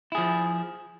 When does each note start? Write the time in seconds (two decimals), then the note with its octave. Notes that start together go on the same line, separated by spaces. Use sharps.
0.12 E4
0.15 G#4
0.18 F3